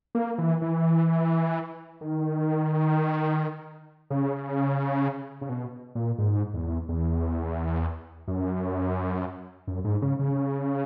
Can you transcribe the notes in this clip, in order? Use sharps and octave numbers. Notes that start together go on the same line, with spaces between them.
A#3
E3
E3
D#3
C#3
C#3
B2
A#2
G#2
E2
E2
F#2
F#2
G#2
C#3
C#3